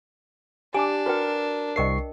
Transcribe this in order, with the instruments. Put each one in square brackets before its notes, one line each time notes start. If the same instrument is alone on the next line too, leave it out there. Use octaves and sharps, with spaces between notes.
[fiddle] D4 [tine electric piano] G4 [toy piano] G#5 D6
[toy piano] F#4 B4 G5 [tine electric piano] A#4
[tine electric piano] C2 C#6 C7 [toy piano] A#4 D#5 G5